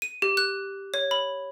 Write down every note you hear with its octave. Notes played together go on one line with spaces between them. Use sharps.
D#7
G4
F#6
C#5
B5